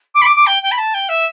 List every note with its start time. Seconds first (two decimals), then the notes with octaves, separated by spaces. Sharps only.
0.14 D6
0.21 B5
0.25 D6
0.36 D6
0.46 G5
0.63 G5
0.71 B5
0.78 A5
0.94 G5
1.09 E5